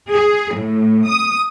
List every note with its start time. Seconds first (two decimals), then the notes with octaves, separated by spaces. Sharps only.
0.12 G#4
0.56 A2
1.09 D#6